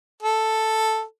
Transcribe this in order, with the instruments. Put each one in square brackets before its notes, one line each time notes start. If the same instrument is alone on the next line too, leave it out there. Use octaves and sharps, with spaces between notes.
[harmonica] A4